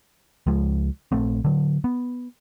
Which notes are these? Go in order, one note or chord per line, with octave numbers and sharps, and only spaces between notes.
C#2 F3 G#3
A#1 A3 C4
D3 F#3
B3